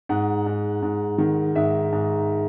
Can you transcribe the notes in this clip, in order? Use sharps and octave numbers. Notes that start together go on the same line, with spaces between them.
G#2 F#5
G#2
G#2
D#3
G#2 E5
G#2